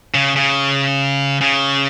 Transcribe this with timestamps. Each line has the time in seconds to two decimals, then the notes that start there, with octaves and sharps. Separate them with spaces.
0.14 C#3
0.36 C#3
1.41 C#3